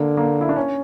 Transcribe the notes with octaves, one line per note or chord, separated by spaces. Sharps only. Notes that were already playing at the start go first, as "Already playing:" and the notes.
Already playing: D3 A#3
A#3
E4
D4
C#4